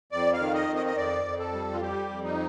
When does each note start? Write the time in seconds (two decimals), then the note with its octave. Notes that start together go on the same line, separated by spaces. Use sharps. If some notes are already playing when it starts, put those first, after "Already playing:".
0.12 F2 D5
0.33 F5
0.40 D#3
0.54 D#5
0.68 F2
0.76 D#5
0.87 D#5
0.97 F2 D5
1.25 F2
1.39 A4
1.52 G3
1.74 F4
1.81 G3 G4
2.09 F2
2.24 D#4